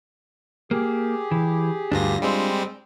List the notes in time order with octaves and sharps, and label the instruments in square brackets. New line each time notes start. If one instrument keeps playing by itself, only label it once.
[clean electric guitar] A#3 [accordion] G4 G#4
[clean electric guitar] E3
[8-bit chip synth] D2 G2 A#6 [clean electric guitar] D4 F4
[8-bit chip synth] G3 G#3 C4